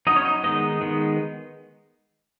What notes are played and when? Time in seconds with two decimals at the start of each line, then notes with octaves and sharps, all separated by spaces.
0.07 F#3 B3 D#4 D#5
0.16 C#4 C#5
0.25 D#4 D#5
0.44 D#3 G#3 B3 D#4 D#5
0.81 D#3 G#3 B3